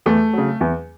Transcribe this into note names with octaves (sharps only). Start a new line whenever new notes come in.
E2 A3
C#3 F#3
E2